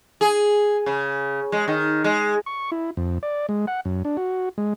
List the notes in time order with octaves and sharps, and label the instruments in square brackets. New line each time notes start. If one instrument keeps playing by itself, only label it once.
[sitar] G#4
C#3
G#3
D#3
G#3
[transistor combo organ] C#6
E4
F2
D5
G#3
F#5
F#2
D4
F#4
G#3